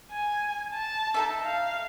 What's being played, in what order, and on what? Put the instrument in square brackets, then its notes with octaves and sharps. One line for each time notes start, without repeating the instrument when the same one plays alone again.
[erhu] G#5
A5
[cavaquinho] D#4 A4 E5
[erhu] F5